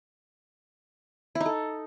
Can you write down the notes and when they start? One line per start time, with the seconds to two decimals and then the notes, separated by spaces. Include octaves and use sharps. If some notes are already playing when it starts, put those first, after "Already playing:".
1.35 E4
1.40 D#4
1.46 A4